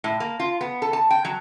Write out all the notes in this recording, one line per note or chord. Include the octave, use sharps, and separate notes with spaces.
A2
A#3
F4
B3
A4
A5
G5
F#3